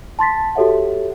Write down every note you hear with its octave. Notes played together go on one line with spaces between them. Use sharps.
A5 C6 A6 B6
F#4 G4 A4 C#5 E5 F#5